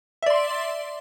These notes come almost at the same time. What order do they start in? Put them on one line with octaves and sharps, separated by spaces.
E5 D5 C6